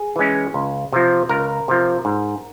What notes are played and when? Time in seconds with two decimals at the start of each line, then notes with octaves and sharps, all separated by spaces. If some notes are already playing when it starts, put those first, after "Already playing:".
Already playing: G#4
0.16 E3 G#3 C#4
0.54 C#2
0.93 C3 F3
1.29 C#2 A#4
1.68 C3 F3
2.05 G#2